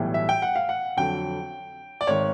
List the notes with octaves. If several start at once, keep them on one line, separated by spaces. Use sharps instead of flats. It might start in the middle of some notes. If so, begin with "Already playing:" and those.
Already playing: B1 A2 E3 G3
E5
G5
F#5
F5
F#5
F2 D3 F#3 G5
D5
G#1 D#3 C#5